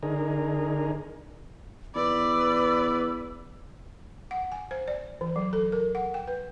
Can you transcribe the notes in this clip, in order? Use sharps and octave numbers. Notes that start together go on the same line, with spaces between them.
D3 D#4 G#4 A#4
E2 B4 D5 B5 E6
F#5
G#5
C5
D5
E3
F#3
A4
A#4
F#5
G5
B4